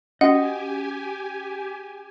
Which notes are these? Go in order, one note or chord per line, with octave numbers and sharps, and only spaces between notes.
C#4 F#4 G4 D#5 F#5 G#5